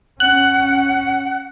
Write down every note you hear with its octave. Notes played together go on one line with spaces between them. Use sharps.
C#4 F#5 F#6